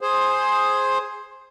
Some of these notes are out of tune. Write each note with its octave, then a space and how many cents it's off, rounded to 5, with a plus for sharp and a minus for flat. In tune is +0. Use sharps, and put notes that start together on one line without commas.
G#4 +0 C5 +10